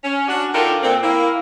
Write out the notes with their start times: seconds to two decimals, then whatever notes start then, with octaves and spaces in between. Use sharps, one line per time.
0.03 C#4
0.28 D4 F#4
0.53 D#3 D4 F4 A4 A#4
0.82 A#2 C4
1.02 A#3 E4